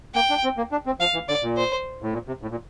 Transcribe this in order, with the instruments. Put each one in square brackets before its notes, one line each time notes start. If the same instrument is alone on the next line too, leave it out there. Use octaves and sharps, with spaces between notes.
[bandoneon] A#3 [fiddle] G5
[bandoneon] D4
C4
A#3
D4
C4
[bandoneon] F3 [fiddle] F5
[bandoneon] E3
[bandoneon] D3 [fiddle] D5
[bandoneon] A#2
[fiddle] C5
[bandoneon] A2
A#2
C3
A2
A#2